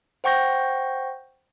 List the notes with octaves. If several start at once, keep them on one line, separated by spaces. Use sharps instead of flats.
C5 F#5 G5 C#6 G6 A#6